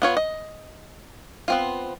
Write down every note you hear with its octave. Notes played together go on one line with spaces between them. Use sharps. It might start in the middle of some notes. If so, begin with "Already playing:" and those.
B3 F4 C#5
D#5
B3 C4 F4